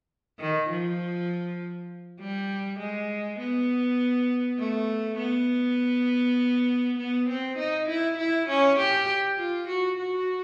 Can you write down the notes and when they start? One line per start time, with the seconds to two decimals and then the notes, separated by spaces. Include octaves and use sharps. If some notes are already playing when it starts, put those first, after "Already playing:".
0.40 D#3
0.70 F3
2.20 G3
2.79 G#3
3.39 B3
4.59 A3
5.19 B3
6.98 B3
7.29 C4
7.58 D#4
7.89 E4
8.18 E4
8.49 C#4
8.79 G4
9.38 F4
9.68 F#4
9.98 F#4